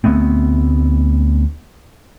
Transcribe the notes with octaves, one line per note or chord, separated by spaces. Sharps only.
D2 A3 B3 C4